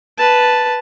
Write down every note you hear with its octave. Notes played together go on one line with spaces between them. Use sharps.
B4 A5